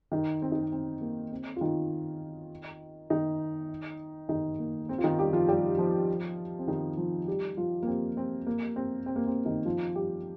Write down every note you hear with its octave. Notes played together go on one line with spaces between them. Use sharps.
D#3 D#4
C4
D#4
C4
C4
A#3
C4
F4
D#3 D#4
D#3 D#4
D#3 D#4
A#3
C4
F4
D#3 D#4
G3 G4
F3 F4
G3 G4
F3 F4
C4
D#3 D#4
F3 F4
G3 G4
F3 F4
A#3
C4
C4
A#3
C4
C4
A#3
C4
D#3 D#4
F3 F4
G3 G4